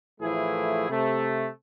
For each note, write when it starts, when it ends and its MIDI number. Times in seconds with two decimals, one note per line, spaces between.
0.20 0.87 45
0.20 0.87 52
0.20 0.87 53
0.20 0.87 57
0.20 0.87 64
0.20 0.87 68
0.89 1.47 48
0.89 1.47 57